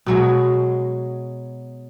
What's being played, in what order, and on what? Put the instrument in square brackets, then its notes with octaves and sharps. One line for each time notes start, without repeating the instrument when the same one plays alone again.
[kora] B2 F#3 G#3